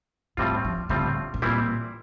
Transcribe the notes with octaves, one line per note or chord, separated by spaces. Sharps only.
A2 E3 G3 C4 F4
F3
A2 D3 G3 C4 F4
A2
A#2 E3 G3 C4 E4